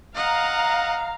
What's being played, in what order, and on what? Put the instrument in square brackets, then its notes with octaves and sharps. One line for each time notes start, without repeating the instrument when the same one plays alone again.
[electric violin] D#5 F#5 [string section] F5 A#5